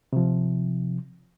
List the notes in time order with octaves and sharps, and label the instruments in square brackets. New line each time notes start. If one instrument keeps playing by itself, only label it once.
[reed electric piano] C3 F3